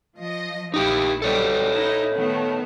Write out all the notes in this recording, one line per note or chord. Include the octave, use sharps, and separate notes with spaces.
F3 D#5
A#1 D#4 E4 G4
G3 A4 C#5 D#5
D#4 E4
D#3 A3 B3